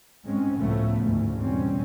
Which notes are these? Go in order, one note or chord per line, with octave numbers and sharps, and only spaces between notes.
G#2 G#3 C4 C#4
C#2 A2 C#3 F3 A3 B3
D2 G#2 C#3
E2 B2 G3 C4 C#4